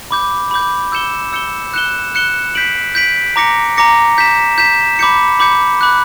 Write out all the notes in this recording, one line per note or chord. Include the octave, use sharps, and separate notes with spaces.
B5 D6 G6
B5 D6 G6
E6 G6 C#7 E7 G7
E6 G6 C#7 E7 G7
F#6 C#7 E7 G7
F#6 C#7 E7 G7
G6 B6 D7 F#7
G6 B6 D7 F#7
A#5 D6 A#6 C#7
A#5 D6 A#6 C#7
G6 B6 E7
G6 B6 E7
B5 D6 G6 C#7
B5 D6 G6 C#7
B5 D6 F#6